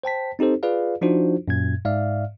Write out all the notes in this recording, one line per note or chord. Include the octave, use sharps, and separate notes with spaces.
C5 G5 A5 B6
C4 D#4 G4 A4 C5
F4 G#4 B4 D5 F5
F3 D4 D#4 F4 F#4 C5
F#2 A#2 G#6
G#2 D5 E5 F5 F6